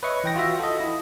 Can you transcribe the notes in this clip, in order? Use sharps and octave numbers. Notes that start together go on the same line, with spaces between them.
B4 C#5 D#5 E5 C#6
E3 G5 A#6
F4 F#4 E5
A4 D#5
E4